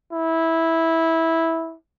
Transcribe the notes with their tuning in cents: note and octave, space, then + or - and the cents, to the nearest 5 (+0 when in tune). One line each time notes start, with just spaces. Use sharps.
E4 -10